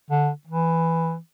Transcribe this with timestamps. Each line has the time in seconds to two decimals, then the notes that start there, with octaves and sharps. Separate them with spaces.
0.10 D3
0.47 E3